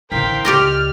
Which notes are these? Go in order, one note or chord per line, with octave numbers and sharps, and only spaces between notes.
A1 D3 A#4 C5 F5 G5 B6
C#2 G4 D5 D#5 F6